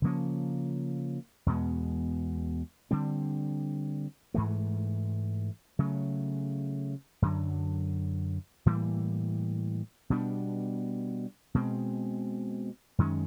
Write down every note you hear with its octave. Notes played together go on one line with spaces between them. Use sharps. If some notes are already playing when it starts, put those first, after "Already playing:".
C#3 F3 A#3 C#4
E2 B2 G#3 B3
D3 G3 C4
G#2 E3 A3
C#3 F#3 A3
F#2 D3 F#3
A2 E3 G3 A#3
B2 G3 B3 D4
B2 G#3 C4
F#2 D#3 G#3 C#4